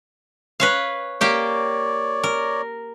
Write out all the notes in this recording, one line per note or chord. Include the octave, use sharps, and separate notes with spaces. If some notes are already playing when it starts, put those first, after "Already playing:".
B4 C#5 F5
A#3 G4 C#5 D5 G5
A#4